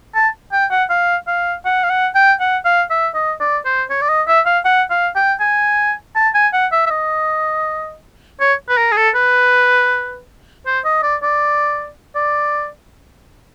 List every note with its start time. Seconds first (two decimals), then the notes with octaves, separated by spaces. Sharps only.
0.15 A5
0.52 G5
0.71 F#5
0.90 F5
1.27 F5
1.65 F#5
1.84 F5
1.90 F#5
2.15 G5
2.40 F#5
2.65 F5
2.90 E5
3.15 D#5
3.40 D5
3.65 C5
3.90 C#5
4.01 D5
4.09 D#5
4.28 E5
4.46 F5
4.65 F#5
4.91 F5
5.15 G5
5.40 G#5
6.16 A5
6.35 G#5
6.53 F#5
6.72 E5
6.86 E5
6.90 D#5
8.41 C#5
8.69 B4
8.78 A#4
8.92 G#4
8.97 A4
9.15 B4
10.66 C5
10.85 D#5
11.03 D5
11.23 D5
12.15 D5